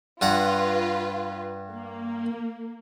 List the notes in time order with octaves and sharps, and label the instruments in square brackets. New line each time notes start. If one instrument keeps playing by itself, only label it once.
[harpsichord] G2 F#5 A#5 [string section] F4 B4
[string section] A#3